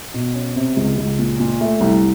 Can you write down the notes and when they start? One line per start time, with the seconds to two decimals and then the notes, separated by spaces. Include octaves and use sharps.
0.14 B2
0.34 C#4
0.56 C3
0.77 C#2
0.98 C#2
1.19 A#2
1.40 A#2
1.61 A3
1.81 C2